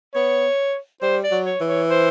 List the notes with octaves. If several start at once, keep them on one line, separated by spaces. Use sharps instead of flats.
B3 C#5
G3 C5
D5
F#3
C#5
E3
C#5
C5